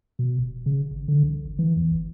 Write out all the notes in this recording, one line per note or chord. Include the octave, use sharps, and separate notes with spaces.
B2
E1
C#3
G#1
D3
C2
G1
E3
E2
G1